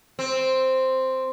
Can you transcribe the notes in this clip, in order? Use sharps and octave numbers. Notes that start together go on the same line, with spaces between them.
C4